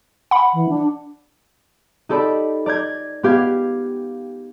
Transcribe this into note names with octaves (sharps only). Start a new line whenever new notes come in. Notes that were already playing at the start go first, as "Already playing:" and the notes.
F#5 B5
E3
D4
D#4 G4 A4 D5 B5
D5 A#5 G6 G#6
B3 G4 F5 G#6